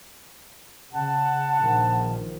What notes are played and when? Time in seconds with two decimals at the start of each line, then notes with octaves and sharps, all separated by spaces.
0.93 C#3 F#5 A5
1.60 A#1 D#3 F3